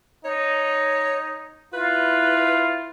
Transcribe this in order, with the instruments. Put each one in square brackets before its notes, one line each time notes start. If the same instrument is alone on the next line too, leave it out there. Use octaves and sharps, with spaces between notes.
[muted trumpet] D#4 [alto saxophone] C#5
[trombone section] E4 [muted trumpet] F4 [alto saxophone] B4